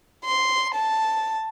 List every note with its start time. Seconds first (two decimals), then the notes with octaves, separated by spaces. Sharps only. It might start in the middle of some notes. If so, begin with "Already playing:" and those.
0.25 C6
0.74 A5